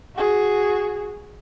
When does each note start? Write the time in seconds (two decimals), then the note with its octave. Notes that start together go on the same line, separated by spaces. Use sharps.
0.16 F#4 G#4